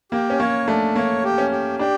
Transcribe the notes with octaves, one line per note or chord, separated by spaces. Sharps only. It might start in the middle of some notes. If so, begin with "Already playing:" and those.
A#3 G4
C#4
A#3 C#5
A3 D4
A#3 C#5
G4
C#4
G4
D4 G4